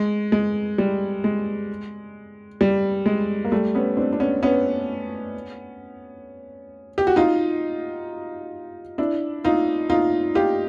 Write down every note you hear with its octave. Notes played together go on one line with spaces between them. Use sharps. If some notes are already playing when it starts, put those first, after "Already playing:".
Already playing: G#3
G#3
G3
G#3
G3
G#3
A#3
G3 A3
B3 C#4
C4 D4
D4
B3 C#4
B3 C#4
G4
F#4
D#4 F4
D4 E4
D#4 F4
D#4 F4
F4 G4